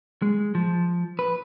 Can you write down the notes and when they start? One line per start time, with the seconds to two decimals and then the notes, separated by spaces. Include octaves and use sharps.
0.22 G#3
0.55 F3
1.19 B4